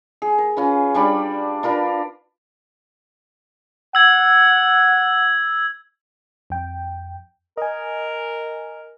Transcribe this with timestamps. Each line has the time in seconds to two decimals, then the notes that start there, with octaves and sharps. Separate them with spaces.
0.22 G#4
0.38 A#4
0.57 C#4 F4 B4
0.95 G3 D4 D5 B5
1.63 D4 F4 A#4 B4
3.95 F#5 E6 G#6
6.50 F2 G5
7.57 A#4 D#5 G#5